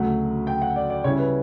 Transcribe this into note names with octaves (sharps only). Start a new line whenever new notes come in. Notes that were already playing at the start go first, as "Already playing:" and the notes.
Already playing: D2 C#3 F#3 A3 F#5
G5
F#5
D5
D5
C#3 G3 C#4 E4 C#5
B4